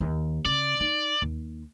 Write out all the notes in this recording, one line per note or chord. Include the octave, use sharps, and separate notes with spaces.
D#2
C#3 D5
D#4
D#2